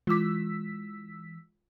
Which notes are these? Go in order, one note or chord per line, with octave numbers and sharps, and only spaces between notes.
E3 G#3 F4 D6 E6 B6